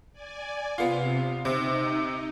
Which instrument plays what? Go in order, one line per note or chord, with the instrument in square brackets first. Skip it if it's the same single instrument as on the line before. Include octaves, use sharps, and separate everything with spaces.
[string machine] D5 G#5
[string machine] C3 [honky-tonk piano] B3 F4
[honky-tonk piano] C3 [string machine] D#4